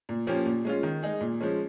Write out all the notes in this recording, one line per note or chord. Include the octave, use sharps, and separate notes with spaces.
A#2
F3 A#3 C#4 G4
A#2
G#3 C#4 F4
D#3
G#3 D#4 G#4
A#2
F3 G#3 C#4